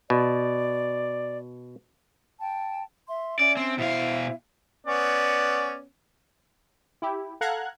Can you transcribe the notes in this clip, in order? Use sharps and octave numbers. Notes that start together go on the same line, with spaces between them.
B2 D5
G5 A5
E5 C6
C#4 D5 E5
C4
B2 E4 C5 E5 F5
B3 C#4 D5
E4 G4
A4 F5 F#5 A#5 F#6 G#6